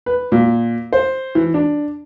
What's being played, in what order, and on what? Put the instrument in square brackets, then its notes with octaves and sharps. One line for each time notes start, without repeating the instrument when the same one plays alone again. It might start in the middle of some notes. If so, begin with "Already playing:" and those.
[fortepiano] B4
A#2
C5
E3
D4